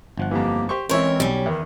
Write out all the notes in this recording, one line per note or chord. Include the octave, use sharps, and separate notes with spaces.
G1 F3 F#5
F2 E3 A#3 G4
G4 C5 C#6
E3 G#3 C4 C#4 E4 A#4 C5 C#5
B1 G3 C#4
E2 D#3 E4